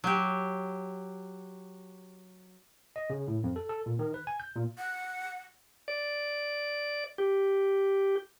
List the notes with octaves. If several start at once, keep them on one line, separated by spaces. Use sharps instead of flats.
F#3 G4
D#5
C#3
A2
F2
A4
A4
A#2
D#3
B4
G#5
G6
A#2
F#5
D5
G4